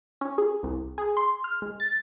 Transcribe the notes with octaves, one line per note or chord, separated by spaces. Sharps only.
C#4
G#4
C2
G#4
C6
F6
G#3
A6